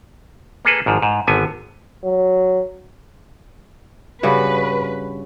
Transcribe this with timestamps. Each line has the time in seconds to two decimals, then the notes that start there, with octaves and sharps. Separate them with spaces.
0.65 A#3 G#4 A4 B4
0.86 G#1 G#2 F3
1.02 G#2
1.27 G#1 D3 B3 G#5
2.05 F#3
4.23 G2 C#3 F#4 B4